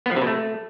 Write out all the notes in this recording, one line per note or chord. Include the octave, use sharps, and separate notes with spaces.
B3
F3
C3
B2
A3